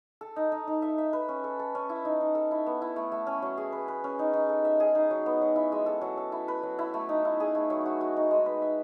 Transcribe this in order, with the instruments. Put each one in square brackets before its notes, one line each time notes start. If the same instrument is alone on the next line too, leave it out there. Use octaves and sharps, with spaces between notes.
[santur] A4
D#4
D#4
D#4
E5
E5
B4
C#4
A4
A4
C#4
E4
D#4
D#4
A4
E4
B3
E4
A3
A3
C#4
F#3
G#4
B4
B4
C#4
D#4
D#4
A4
E5
G#4
D#4
F#3
B3
F#3
E4
G#3
A4
F#3
A4
E4
B4
F#3
E4
A3
D#4
E4
G#4
A3
F#3
F#4
F#4
D#4
G#3
B4
E5